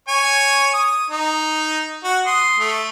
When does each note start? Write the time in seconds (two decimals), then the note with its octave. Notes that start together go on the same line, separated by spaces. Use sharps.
0.08 C#5 G#5 C#6
0.74 D#6
1.10 D#4
2.04 F#4
2.26 C6 D#6
2.59 A3